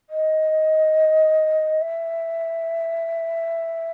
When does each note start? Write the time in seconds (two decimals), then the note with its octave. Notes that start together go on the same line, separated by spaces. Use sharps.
0.09 D#5
1.81 E5